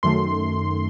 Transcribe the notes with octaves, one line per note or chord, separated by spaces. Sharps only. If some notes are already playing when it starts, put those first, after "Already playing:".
F#2 D#3 A3 C6